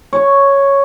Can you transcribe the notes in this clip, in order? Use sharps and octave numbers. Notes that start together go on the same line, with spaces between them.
C#5